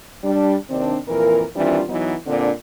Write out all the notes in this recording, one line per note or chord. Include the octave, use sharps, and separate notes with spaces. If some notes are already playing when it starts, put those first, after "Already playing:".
G3 D4
D#2 C3 D#3 C4 D4
F2 A#2 E3 A#4
D#3 E3 G3 C4 D4 F4
E3 F#3 B3 D#4
A#2 D3 C4 D4 D5